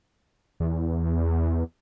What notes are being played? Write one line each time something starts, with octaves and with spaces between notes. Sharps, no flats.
E2